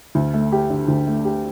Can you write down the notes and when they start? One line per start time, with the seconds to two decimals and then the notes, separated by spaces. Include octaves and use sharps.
0.15 D2
0.34 A3
0.52 G4
0.70 D3
0.88 D2
1.07 A3
1.25 G4